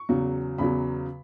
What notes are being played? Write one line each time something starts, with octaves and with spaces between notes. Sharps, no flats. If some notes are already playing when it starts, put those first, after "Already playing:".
Already playing: C#6
E2 C#3 F#3
E2 C#3 F#3 B5